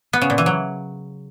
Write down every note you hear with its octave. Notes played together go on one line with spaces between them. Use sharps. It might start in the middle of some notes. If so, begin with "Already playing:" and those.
B3
C#3
A#2
E3
F#3